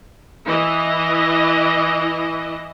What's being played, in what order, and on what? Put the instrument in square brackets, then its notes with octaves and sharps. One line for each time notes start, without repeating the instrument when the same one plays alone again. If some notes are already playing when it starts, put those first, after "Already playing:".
[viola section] E3 E4 D#5